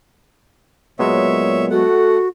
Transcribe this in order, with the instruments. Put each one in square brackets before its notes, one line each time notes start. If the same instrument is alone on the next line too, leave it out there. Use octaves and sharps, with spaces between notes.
[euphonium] A#2 [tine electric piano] F#3 G#3 B3 [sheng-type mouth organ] C#5 E5
[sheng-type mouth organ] A3 F#5 [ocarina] F#4 [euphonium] A4